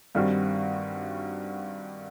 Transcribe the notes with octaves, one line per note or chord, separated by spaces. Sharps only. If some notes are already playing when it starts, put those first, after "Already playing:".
G2 D#3 G3 C4 F#4